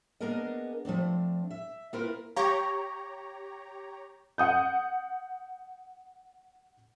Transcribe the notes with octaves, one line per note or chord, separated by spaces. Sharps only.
A#3 B3 D4 G#4 A#4 D#5
F3 A3 C4 D4
E5
A#3 C4 E4 F4 A#4 B4
G4 C#5 F5 A#5 C#6
F#5 D#6 G6